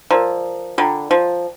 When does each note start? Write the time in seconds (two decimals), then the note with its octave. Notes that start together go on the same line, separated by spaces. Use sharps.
0.11 F3 A#4 D5 A#5
0.78 D3 F4 D5 G5 A#5
1.11 F3